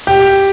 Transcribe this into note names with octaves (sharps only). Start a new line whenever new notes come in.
G4